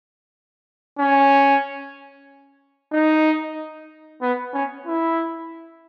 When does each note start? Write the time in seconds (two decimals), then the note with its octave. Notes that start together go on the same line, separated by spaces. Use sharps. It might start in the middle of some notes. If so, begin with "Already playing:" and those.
0.99 C#4
2.92 D#4
4.22 B3
4.54 C#4
4.86 E4